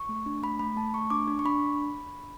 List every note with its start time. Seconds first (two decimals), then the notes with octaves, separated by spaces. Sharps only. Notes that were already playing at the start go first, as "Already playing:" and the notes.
Already playing: C#6
0.09 A3
0.26 D4
0.42 A3 B5
0.59 A3 B5
0.76 A3 A5
0.93 A3 C#6
1.10 D4 D6
1.28 D4
1.39 C#6
1.45 D4 B5